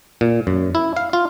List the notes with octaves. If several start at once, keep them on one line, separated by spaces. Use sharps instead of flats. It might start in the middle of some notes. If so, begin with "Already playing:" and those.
A#2
F#2
E4
F5
F4